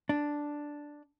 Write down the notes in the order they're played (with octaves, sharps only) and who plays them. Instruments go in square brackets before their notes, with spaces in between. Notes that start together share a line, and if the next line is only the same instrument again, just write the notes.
[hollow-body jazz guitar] D4